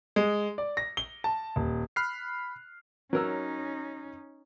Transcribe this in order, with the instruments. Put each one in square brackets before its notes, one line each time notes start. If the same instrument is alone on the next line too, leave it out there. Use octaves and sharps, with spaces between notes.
[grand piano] G#3
D5
A#6
G7
A5
D#1
[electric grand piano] B5 F6 F#6 C7
[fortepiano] F#3 A#4 E6 [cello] C#4 D#4